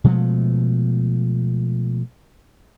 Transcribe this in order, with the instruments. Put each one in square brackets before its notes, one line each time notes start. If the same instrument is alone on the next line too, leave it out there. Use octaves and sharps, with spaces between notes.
[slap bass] B2 F3 G#3 A3